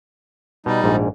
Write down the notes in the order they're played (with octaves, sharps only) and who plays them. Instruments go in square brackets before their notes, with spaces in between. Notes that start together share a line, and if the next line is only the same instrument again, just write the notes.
[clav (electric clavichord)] B2 [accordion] G3 D#4
[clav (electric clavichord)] A#1 G#2